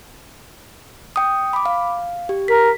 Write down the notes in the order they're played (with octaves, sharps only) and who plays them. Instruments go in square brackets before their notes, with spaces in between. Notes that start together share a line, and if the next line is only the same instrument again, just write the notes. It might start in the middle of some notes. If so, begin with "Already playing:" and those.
[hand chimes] G5 D#6
B5 D6
F5
G4
[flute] A#4 [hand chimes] B6